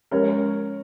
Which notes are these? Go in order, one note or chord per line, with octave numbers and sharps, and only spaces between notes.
F3 G#3 C#4 G4 A#4 C#5